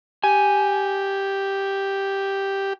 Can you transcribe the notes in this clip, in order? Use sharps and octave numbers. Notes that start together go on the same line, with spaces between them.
G4 G#5